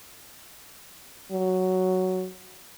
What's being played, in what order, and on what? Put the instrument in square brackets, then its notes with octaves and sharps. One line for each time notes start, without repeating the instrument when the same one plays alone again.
[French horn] F#3